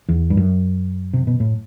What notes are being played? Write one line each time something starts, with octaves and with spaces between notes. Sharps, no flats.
E2
G2
F#2
C3
B2
A2